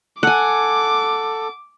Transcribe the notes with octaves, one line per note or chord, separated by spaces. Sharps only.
A4 F#5 G#5 D6